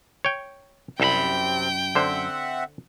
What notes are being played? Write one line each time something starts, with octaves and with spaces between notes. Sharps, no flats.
C#5 G5
C2 F#2 C3 C4 A4 G5 B5
D3 C4 C5 E5 F#5